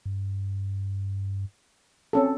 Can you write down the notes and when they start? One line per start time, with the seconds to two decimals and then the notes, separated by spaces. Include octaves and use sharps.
0.06 G2
2.13 C4 C#4 A4